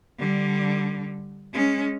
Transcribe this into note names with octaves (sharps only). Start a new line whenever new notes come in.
D3 G3
G#3 C#4